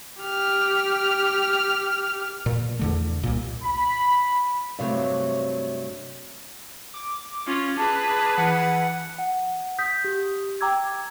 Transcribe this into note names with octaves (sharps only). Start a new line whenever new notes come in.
G4 F6
A#2
E2 D3 A3
C2 A#2
B5
G2 C3 F#3 A3
D6
C#4 F4
G#4 B4 A5
E3 F#5
F#5
D#6 G6 B6
G4
G5 A#5 D6 E6 G#6